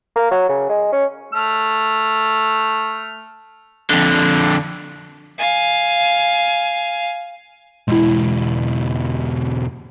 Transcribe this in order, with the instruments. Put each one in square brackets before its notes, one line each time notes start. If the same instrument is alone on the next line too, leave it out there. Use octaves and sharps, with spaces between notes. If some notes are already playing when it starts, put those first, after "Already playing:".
[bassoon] A#3
F#3
C#3
G#3
C#4
[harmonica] A3 F6
[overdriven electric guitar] F2 D3
[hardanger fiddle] F5 G#5
[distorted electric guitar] B1 E2 [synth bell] G#3 E4